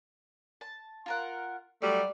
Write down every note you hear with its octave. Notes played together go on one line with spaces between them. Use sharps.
A5
F4 A#4 F#5
F#3 G3 A3 D5